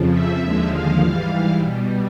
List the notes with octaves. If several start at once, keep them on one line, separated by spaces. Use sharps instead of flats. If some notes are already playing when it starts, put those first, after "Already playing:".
Already playing: F2 C#3 F3
E5
D#2 D3 F3 G#3
F5
G#2 E3 G3
B2 G3